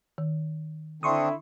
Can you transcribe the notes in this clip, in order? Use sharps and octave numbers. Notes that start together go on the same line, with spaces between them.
D#3
D3 C4 D4 E4 C6 C#6 D#6